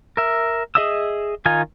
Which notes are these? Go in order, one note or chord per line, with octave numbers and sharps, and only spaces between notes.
A#4 E5
G#4 D#5 E5 D#6 E6
D#3 D#4 F4 G#5